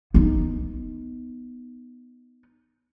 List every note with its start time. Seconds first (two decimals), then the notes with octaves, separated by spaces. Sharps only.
0.14 B3 D#4